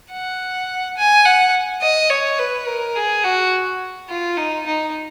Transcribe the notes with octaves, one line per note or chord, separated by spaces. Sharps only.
F#5
G#5
F#5
D#5
C#5
B4
A#4
G#4
F#4
F4
D#4
D#4